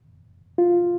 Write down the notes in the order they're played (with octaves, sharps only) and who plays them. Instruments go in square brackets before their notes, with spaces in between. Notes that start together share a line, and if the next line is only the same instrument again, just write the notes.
[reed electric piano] F4